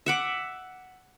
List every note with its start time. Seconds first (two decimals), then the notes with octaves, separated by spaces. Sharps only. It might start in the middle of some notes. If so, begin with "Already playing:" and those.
0.06 E5 F#5 D6